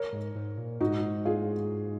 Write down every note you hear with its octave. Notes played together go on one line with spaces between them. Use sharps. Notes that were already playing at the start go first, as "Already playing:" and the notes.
Already playing: A#4 C#5
G#2
G#2
A#2
G#2 D#4 F#4
F4 G#4